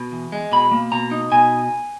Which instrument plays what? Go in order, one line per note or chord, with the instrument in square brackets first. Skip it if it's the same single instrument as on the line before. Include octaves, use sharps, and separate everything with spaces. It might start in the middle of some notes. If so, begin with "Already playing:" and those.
Already playing: [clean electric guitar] B2
E2
G#3
B2 B5
A#3
B2 A#5
D#4
B2 G#5